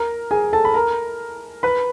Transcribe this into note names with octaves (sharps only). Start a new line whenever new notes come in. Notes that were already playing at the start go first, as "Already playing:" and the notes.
Already playing: A#4 A#5
G#4 G#5
A4 A5
B5
A#4 A#5
B4 B5